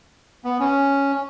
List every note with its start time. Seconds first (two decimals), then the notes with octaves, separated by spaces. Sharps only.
0.45 B3
0.59 C#4